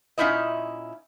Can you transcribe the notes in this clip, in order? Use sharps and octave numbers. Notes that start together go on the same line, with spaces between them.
A#2 C#4 D#4 E4 D#5